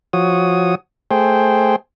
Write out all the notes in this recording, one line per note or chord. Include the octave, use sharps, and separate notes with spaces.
F3 F#4 C#5 D#6
A3 G#4 C5 G5